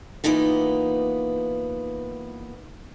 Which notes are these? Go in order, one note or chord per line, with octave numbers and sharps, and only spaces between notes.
E3 A#3 B3 D#4 F4